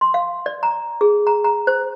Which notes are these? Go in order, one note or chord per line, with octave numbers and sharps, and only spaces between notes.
C6
F5
D5
A#5
G#4
A#5
A#5
C5